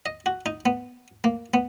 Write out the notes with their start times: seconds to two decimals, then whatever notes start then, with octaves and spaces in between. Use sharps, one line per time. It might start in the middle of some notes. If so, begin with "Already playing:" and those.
0.06 D#5
0.26 F#4
0.46 D#4
0.66 B3
1.24 A#3
1.54 B3